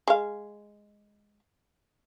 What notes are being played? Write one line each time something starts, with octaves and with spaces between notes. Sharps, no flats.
G#3 F5